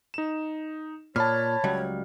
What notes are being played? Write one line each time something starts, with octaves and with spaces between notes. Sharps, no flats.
D#4 E7
A#2 C#5 A5 B5 F6
C#2 F#3 G3